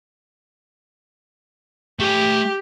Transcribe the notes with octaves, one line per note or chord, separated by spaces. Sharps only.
A3 G4 G#5